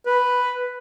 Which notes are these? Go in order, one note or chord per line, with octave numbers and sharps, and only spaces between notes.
B4